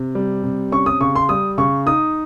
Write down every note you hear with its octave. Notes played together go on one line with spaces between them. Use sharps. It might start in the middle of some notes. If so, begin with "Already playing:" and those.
Already playing: C3
G3
C3
C#4 C#6
D#6
C#3 C#6
C6
G3 D#6
C#3 C#6
D#4 D#6